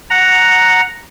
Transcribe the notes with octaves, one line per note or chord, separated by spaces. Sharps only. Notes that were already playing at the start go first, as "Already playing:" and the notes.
F#5 A#5